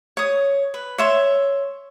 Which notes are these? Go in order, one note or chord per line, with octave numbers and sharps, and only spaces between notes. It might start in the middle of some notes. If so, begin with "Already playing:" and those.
C#5 D#6
B4
C#5 E5 C6